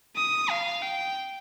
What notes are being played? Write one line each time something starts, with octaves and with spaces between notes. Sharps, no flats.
D#6
F5
G5